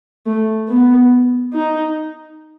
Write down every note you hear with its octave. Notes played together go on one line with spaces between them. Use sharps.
A3
B3
D#4